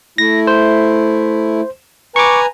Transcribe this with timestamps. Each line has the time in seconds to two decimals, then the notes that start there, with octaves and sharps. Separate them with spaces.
0.18 A3 E4 A#6
0.47 C5
2.16 B4 G#5 A#5 C#6 D6